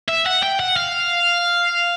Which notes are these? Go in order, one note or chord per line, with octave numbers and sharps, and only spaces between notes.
E5
F#5
G5
F#5
F5